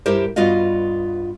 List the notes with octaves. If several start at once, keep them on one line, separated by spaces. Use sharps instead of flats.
G2 E4 G4 A#4 C5
G2 B3 F4 F#4 D#5 F5